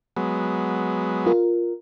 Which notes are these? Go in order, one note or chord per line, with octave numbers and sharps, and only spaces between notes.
F#3 G#3 B3
F4 A#4